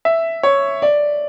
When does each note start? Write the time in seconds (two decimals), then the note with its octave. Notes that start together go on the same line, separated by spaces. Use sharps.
0.05 E5
0.43 C#5
0.82 D5